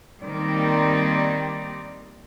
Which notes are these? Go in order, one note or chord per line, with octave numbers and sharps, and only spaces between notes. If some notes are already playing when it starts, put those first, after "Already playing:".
D#3 G3 A#3 C4 D#4 D5